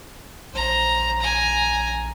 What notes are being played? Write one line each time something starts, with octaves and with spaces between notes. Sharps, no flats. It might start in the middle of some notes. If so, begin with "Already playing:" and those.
A#1 C5 A#5
G#5 A#5